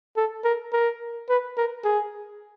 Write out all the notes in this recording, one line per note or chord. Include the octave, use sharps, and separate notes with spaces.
A4
A#4
A#4
B4
A#4
G#4